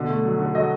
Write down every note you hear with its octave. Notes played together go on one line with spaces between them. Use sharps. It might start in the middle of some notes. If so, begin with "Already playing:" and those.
Already playing: B2 D3
A3
F#3
D3
F#3 D#5